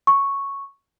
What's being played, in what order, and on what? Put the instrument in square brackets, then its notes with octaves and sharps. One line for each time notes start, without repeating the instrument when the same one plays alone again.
[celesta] C#6